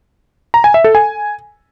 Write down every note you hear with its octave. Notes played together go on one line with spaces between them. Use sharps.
A#5
G#5
E5
A4
G#5